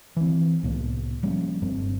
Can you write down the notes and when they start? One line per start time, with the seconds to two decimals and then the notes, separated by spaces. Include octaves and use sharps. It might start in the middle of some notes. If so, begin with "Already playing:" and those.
0.16 E3 C4
0.63 C2 A2 A#3 B3
1.23 F3 G3 A#3 C#4
1.62 F#1 G2 C4